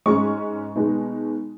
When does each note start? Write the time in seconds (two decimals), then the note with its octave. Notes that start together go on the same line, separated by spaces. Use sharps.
0.06 G#2 G#3 C#4 C#6
0.76 B2 G#3 B3 D#4